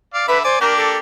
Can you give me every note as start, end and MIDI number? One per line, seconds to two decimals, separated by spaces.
0.14 0.25 74
0.14 0.25 77
0.28 0.41 50
0.28 0.38 71
0.28 0.41 76
0.28 0.41 83
0.44 0.58 72
0.44 0.60 74
0.44 0.60 80
0.61 0.98 58
0.61 0.98 62
0.61 0.98 67
0.61 0.74 70
0.77 0.98 69